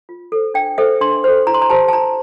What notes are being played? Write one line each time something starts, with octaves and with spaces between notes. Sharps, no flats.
F4
A4 C5
D4 G5
A4 C5 E5
D4 C6
A4 C5
E4 A#5
C6
A#5
G4 C5 A5
A5
E4 A#5